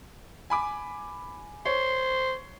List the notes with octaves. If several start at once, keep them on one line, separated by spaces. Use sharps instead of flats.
G#5 B5 D6
C5 C#5